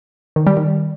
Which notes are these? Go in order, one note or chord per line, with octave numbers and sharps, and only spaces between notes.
D#3
G3
D#3